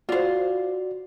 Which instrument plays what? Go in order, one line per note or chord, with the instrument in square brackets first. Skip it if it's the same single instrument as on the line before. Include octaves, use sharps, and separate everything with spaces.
[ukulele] F4 C5 [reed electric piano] F#4 D5